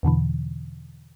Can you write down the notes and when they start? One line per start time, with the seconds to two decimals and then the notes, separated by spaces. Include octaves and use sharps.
0.03 E2 B2 D3 E3